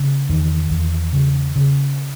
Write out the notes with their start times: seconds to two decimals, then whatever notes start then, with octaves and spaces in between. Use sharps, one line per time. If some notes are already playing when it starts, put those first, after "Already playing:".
Already playing: C#3
0.29 E2 D#3
0.71 E2
1.13 C#3
1.56 C#3